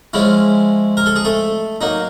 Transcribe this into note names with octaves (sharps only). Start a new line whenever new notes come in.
F3 G#3 C#4 E4
A#4
A4
G#4
A3 A4
F#3 A#3 D#4